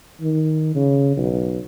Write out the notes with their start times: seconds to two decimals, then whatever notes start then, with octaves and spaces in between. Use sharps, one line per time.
0.21 D#3
0.75 C#3
1.17 B1